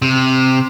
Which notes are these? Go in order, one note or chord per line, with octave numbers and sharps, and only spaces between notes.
C3